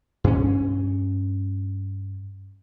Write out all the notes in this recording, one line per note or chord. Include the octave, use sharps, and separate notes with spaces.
G2 C#4